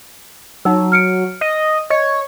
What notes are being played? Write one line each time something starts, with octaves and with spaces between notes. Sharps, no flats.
F#3 D#4 E6
F6 C#7 D7
D#5
C#5 D#5